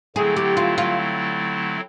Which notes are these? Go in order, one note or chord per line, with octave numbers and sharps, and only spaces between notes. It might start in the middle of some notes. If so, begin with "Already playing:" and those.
D3 F#3 A3 C4 E4 G#4
G4
F4
F4